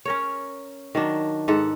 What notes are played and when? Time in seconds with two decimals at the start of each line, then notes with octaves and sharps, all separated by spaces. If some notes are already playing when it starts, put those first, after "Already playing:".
0.05 C#4 A#4 C#5
0.95 D#3 F#3 D4
1.48 G#2 A4 F#5